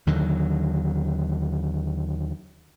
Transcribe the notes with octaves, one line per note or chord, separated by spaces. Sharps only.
D#2 D3 D#3 F#3